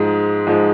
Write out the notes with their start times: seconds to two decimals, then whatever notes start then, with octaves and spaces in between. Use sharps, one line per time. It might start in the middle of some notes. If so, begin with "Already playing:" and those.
Already playing: G#2 F3 G#3 D#4
0.47 G#2 F3 G#3 D#4